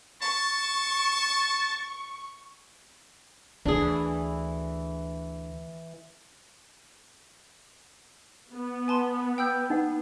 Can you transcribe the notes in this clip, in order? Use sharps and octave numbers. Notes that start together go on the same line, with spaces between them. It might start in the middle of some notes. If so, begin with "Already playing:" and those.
A5 C#6
D2 E3 D4 G#4
B3
G#5 A5 C6
G5 E6 G6
D#4 F#5